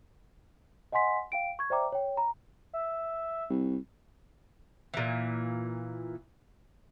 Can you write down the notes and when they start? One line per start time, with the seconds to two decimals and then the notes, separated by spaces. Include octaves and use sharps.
0.92 D#5 F#5 G#5 C6 B6
1.32 F5 G5 D7
1.59 C#6 G#6
1.70 C5 D5 E5 G5 A#5 D6
1.92 C#5 G5
2.17 A#5 B5
2.73 E5
3.50 C2
4.94 A#2 E3